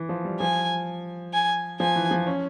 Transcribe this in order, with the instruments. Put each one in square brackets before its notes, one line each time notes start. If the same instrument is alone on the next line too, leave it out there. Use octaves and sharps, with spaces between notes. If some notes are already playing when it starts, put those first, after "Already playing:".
Already playing: [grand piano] E3
F3
G3
[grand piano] F3 [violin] G#5
[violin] G#5
[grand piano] F3 [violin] G#5
[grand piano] E3
F3
C#4